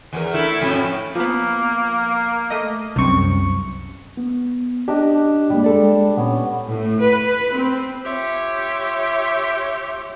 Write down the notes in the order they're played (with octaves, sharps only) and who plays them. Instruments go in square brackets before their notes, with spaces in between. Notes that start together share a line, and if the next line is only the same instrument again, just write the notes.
[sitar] E2 A#4
A3 E4
F2 A2
[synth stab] F3 B3 [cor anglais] A#3
[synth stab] A3 D#5
[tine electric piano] C2 F#2 C#6 [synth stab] C3 C4
[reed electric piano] B3
[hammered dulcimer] D4 [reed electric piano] G4 D#5
[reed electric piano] G2 G#3 A#3 [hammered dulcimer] G3
[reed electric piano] G#3 A4 D5
[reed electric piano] A#2 [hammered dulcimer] B3 C#4
[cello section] A2
B4
C4
[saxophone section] F4 G4 C#5 E5